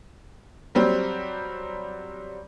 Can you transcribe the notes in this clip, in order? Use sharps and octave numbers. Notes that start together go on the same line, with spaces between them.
F#3 G3 C4